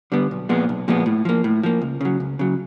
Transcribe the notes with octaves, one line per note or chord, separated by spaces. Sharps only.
D3 G3 B3
B1
A#2 F3 G#3 B3
B1
A#2 F3 G#3 B3
A2
F3 A#3
A2
F3 A#3
C#2
C#3 F#3
C#2
C#3 F#3